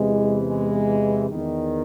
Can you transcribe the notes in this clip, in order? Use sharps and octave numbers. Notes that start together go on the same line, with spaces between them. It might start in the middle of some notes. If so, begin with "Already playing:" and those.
Already playing: E2 C3 E3 G#3
G#3
E2 D#3